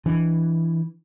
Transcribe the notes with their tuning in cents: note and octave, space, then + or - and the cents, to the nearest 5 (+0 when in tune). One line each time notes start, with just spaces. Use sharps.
E3 +0 D4 +0